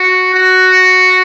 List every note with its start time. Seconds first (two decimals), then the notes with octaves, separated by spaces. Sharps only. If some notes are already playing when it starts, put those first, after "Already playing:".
Already playing: F#4
0.34 F#4